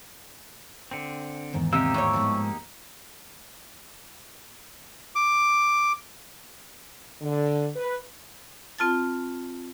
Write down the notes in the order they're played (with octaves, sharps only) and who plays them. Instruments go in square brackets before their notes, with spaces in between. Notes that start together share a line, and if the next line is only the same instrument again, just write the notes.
[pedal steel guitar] D3 C4
[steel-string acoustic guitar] E2 G#2 D#3
[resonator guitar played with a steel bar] C3 [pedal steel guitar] A#3 D#4 G4 [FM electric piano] E6
[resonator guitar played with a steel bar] A2 C#5
[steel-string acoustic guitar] G#2 F3 G#3
[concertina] D6
[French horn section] D3
B4
[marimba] C4 F4 A5 A6